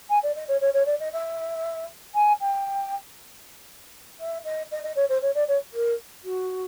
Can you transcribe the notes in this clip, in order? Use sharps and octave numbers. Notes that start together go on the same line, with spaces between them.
G#5
D5
D#5
C#5
C#5
C#5
D5
D#5
E5
G#5
G5
E5
D#5
D#5
D#5
C#5
C5
C#5
D5
C#5
A#4
F#4